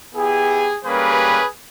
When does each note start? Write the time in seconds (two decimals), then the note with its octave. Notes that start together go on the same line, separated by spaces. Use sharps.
0.15 B3 E4 G4 G#4
0.84 G3 A#3 C#4 G4 G#4 B4